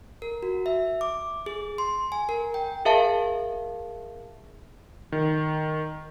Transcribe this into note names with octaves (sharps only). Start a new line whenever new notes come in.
A#4
F#4
E5
D6
G#4
C6
G#5
A#4
G5
G#4 A#4 E5 F5 A5
D#3